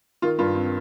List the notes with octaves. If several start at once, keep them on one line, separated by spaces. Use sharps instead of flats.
D#3 F4
G2 F4
C4